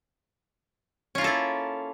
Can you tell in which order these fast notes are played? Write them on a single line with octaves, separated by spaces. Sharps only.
C#4 F4 A#3 A4 E4